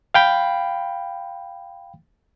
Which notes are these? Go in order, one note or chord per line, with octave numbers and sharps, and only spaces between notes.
F5 G5 B5